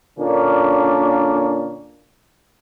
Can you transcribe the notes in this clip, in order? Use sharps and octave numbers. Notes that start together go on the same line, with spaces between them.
A#2 D3 A#3 C#4 D4